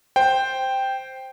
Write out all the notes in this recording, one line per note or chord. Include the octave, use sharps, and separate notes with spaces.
C5 G5